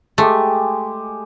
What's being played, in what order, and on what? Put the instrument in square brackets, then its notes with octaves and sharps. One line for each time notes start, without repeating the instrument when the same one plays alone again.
[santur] G#3 G4 [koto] A3